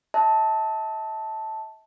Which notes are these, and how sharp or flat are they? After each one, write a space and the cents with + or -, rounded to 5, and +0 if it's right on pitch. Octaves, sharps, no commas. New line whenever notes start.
E5 -45 A5 +0